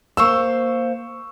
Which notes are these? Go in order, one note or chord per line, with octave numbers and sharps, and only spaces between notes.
A#3 C5 F5 C#6 E6